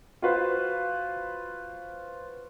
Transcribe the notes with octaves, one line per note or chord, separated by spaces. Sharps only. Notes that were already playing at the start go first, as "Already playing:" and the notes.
F4 F#4 B4 C5